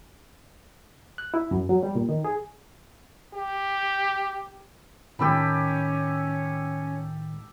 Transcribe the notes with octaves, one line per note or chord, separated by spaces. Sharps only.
F#6
E4
F#2
F#3
G3
A#2
D#3
G#4
G4
A2 D#3 G#3 C#4 G4 A4 B5